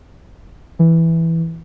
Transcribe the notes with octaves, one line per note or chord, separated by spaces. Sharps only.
E3